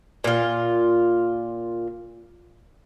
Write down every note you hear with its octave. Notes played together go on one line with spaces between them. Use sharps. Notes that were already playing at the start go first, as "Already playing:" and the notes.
A#2 F4